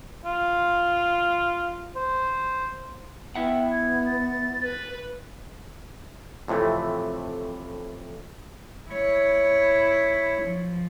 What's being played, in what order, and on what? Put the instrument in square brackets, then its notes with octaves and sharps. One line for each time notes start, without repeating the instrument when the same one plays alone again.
[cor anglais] F4
C5
[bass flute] B3 [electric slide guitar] E4 E5 F#5 [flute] G5
[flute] G#6
A6
[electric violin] B4
[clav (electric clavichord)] F2 A2 C3 E3 A3
[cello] E4 C#5
F3